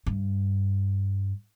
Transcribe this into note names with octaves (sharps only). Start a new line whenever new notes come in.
G2